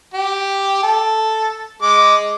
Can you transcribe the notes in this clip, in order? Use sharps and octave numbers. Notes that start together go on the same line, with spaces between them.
G4
A4
G#3 D6